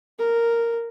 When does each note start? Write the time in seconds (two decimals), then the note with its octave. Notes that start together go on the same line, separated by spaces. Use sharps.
0.19 A#4